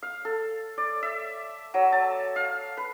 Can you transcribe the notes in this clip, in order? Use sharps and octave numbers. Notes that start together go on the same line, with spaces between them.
F5
A4
D5
E5
F#3
A5
F5
B4